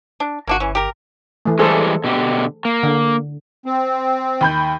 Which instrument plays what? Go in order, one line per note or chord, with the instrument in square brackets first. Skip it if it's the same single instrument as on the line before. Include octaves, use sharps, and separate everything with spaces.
[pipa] D4
[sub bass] G1 [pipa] A#3 D4 F#4
[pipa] E3 C#4
G4 A#4
[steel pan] E3 A3
[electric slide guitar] E3 G3 G#3 [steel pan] G#4 A4 C5
[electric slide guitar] B2 D3 G4
A#3
[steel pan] D3
[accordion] C4
[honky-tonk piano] D#2 B5 G6